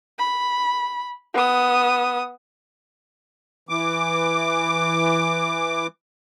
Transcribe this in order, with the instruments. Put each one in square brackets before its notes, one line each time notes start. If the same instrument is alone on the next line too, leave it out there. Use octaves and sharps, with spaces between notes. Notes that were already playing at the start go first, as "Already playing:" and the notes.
[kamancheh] B5
B3 D#6
[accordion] E3 D6